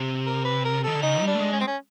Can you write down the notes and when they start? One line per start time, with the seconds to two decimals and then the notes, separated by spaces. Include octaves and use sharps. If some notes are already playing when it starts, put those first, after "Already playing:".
Already playing: C3
0.26 A#4
0.45 B4
0.65 A#4
0.84 D#3 A4
0.95 D3
1.02 C#3 D#4
1.21 G3
1.27 D4
1.35 A3
1.40 G#3
1.53 C#4
1.60 C4
1.67 C#4